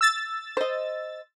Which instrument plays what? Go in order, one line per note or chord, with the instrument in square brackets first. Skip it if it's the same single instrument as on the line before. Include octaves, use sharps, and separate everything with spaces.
[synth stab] E6 A6
[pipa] C5 D#5